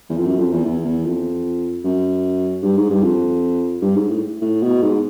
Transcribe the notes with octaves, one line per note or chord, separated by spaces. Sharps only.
E2
F2
F#2
F2
E2
E2
E2
F2
F#2
G2
G#2
G2
F2
G2
G#2
A2
A2
B2
G#2